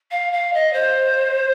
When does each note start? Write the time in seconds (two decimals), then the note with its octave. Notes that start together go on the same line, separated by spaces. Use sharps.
0.11 F5
0.33 F5
0.53 D#5
0.73 C5